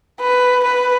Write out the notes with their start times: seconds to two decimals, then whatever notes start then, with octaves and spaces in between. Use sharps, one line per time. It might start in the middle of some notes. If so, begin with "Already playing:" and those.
0.21 B4
0.64 B4